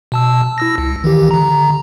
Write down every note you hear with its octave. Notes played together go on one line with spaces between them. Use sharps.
B2 A5 E6
E4 E6 A#6
C#2
D#3 E3 G4
D3 A#5